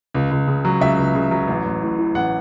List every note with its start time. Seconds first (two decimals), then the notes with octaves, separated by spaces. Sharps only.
0.14 C#2
0.31 C#2
0.47 C#3
0.65 F#3
0.81 C#2 E5
0.98 C#2
1.15 C#3
1.31 F#3
1.48 A1
1.65 A1
1.82 A2
1.99 E3
2.15 A1 F#5